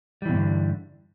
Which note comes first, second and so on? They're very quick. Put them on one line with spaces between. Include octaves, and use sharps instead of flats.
G3 E3 B2 G2 D3